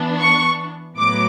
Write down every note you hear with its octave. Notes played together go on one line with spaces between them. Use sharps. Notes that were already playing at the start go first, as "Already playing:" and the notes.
Already playing: E3 B3 D4
C#6
A2 F#3 B3 D6